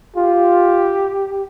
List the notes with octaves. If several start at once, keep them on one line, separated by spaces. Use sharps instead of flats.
F4 G4